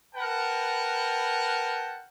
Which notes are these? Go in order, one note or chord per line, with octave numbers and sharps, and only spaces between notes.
A#4 B4 F#5 G5 A5